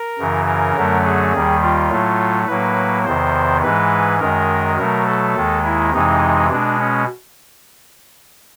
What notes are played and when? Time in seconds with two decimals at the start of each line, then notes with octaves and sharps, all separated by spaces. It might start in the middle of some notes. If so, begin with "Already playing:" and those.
Already playing: A#4
0.18 F#2 C#3 E3
0.46 A#4
0.76 F#2 D3 F#3 A3
1.05 G#4
1.33 D#2 D#3 G3
1.62 F4
1.90 A2 F#3 A3
2.47 A2 F#3 A#3 B4
3.05 E2 C3 D#3 C5
3.63 G#2 E3 G#3 B4
4.20 F#2 D#3 G#3 A#4
4.77 B2 F#3 A3 A#4
5.07 A4
5.35 D#2 D#3 G#3
5.64 E4
5.93 F2 C3 E3 G#3 D#4
6.50 B2 G#3 D4
6.79 C#4